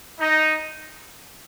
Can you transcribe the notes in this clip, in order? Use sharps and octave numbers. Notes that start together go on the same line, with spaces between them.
D#4